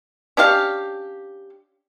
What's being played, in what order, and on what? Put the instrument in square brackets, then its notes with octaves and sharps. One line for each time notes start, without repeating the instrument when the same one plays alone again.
[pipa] C#4 D4 G4 F5